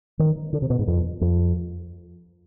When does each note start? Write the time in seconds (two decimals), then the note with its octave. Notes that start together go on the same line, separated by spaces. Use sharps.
0.19 D#3
0.53 D3
0.62 C3
0.70 B2
0.79 G#2
0.87 F2
1.21 F2